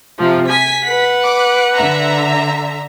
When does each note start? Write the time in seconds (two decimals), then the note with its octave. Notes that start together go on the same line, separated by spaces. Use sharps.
0.18 C3 F3
0.49 G#5 B6
0.85 B4 F#5
1.23 D6
1.74 D3 E5 A#5